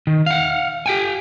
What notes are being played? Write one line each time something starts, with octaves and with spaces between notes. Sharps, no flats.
D#3
F5 F#5
G4 G5 G#5